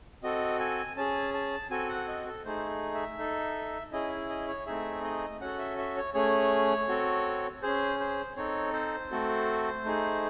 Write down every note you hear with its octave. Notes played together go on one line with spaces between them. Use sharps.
C4 F#4 A4 D#5
G#5
C#4 G#4 A5
A5
C4 F#4 A4 G#5
F#5
D#5
A4
A3 D#4 G#4 C5
E5
D#4 A4
C#4 E4 G#4 D#5
D#5
C#5
A3 C4 D#4 G#4 E5
D#5
C#4 F#4 A4 F#5
E5
E5
C#5
A3 C#4 G#4 C#5
C4 F#4 A4
C#4 G#4 C5
C5
C4 D#4 A4 C#5
C5
A3 C4 F#4 A4
A3 D#4 G#4